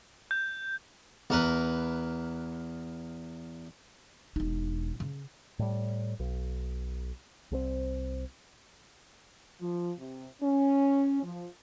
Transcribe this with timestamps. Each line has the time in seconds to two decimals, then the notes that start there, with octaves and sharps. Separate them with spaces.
0.31 G6
1.30 E2 A#4 B4
4.36 E1 D#4
5.00 C#3
5.59 A2 G3
6.20 B1
7.51 C2 G#3 C4
9.61 F3
9.99 C3
10.42 C#4
11.23 F3